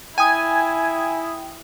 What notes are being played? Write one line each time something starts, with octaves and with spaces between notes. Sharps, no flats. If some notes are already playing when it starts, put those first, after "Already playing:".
E4 G5 G#5 D#6